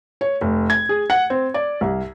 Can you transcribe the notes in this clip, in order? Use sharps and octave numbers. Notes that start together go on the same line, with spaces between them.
C#5
F1
G#6
G#4
F#5
C4
D5
C2